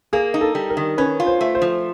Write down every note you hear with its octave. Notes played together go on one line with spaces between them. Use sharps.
A#3 G#4
D#4
A4
G3
A#4
D#3
C#4 B4
F4
C5
A3
C5
F3